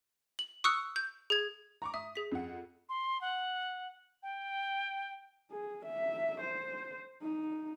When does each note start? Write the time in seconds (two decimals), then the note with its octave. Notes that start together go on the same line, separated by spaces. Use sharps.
0.39 F#7
0.64 C#6 D#6 E6 F#6 C#7
0.96 G6
1.30 G#4 G#6
1.82 A#5 C#6 D6
1.94 E5 D#6
2.15 G#4 B6
2.31 F2 F#5
2.89 C6
3.21 F#5
4.23 G5
5.51 G#4
5.85 E5
6.40 C5
7.22 D#4